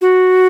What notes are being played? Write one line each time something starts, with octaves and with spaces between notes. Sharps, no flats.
F#4